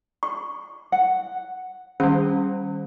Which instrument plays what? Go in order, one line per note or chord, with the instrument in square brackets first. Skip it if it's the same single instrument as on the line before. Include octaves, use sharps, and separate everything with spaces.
[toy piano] C#6
[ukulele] F#5
[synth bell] D#3 G3 [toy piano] C#4 [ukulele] C5